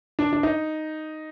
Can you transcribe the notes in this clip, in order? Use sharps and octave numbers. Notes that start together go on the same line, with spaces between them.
D4
D4
D#4